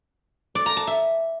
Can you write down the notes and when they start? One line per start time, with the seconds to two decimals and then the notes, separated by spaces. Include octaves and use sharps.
0.55 D5
0.66 A#5
0.77 A5
0.87 E5